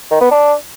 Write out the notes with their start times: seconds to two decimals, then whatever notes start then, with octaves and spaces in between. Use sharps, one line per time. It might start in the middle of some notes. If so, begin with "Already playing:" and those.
0.11 D#3
0.21 B3
0.31 D4